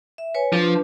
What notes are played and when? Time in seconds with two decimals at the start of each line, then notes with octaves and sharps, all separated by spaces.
0.18 E5
0.35 B4 C#5 G#5
0.53 F3 D4 B4